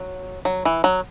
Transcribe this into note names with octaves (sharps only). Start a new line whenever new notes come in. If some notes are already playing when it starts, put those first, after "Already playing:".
Already playing: F#3
F#3
E3
F#3